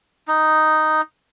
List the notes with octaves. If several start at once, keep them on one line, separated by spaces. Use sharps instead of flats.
D#4